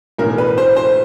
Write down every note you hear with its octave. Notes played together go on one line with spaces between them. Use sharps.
B1 A2 E3 A#4
B4
C5
C5